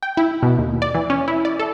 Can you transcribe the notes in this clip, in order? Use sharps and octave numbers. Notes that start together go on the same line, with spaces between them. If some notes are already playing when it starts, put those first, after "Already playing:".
G5
E4
B2
D#2
D5
E3
C#4
E4
D5
A4